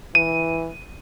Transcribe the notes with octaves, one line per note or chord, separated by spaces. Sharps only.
E3 D#7